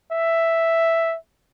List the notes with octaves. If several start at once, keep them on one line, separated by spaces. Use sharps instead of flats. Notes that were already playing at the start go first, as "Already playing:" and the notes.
E5